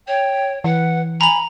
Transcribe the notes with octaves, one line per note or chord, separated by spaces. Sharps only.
C#5 G5
E3 B4 F#5
G#5 A#5 B5 F7